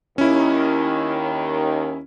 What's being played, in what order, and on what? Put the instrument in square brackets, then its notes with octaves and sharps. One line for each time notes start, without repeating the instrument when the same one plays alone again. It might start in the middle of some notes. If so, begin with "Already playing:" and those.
[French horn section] D#2 D#3 [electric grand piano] C#4 E4